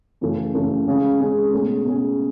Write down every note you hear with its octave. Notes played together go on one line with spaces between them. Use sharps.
F#2 C#3 E3 A3
F#2 C#3 E3 A3
C#3 G#3 C#4 G#4
C#3 G#3 C#4 G#4
B2 A3 C#4 G#4
B2 A3 C#4 G#4